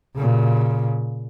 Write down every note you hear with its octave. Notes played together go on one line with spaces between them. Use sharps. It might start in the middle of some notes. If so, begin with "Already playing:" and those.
A#2 C#3